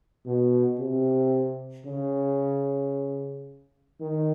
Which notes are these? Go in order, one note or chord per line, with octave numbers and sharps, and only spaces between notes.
B2
C3
C#3
D#3